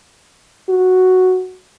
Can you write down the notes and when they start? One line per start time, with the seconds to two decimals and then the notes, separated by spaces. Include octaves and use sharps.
0.69 F#4